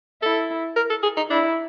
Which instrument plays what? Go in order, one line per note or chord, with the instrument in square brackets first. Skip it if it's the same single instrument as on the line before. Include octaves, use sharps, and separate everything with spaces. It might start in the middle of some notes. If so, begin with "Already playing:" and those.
[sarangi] E4 [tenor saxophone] A4
[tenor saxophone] A#4
A4
G#4
D#4
[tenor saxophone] D4 [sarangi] E4